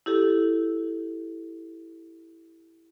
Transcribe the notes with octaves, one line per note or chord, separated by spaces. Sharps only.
E4 G4 A4